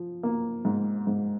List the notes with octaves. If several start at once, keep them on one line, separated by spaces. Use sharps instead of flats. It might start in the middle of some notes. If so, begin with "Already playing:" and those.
Already playing: F3
A#3
G#2
G#2